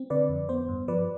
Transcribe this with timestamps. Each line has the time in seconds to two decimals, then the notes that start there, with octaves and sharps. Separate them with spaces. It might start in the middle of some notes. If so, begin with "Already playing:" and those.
Already playing: C4
0.10 D3 B4 D5
0.29 F2
0.49 B3 C5
0.69 G2
0.88 F3 B4 D5